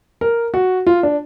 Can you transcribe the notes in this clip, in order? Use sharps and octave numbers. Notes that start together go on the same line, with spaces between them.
A#4
F#4
F4
D4